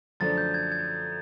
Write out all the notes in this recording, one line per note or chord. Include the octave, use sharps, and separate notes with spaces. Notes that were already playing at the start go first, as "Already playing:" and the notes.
F#2 D3 F3 A3 D4 A6
G6
G#6
G#6